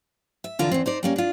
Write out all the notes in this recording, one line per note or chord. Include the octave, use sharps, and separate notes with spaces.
E5
E2 D3 F4 A#4
E2 C4
D#4 C5 D5
G3 A#3 C#4
D4 F4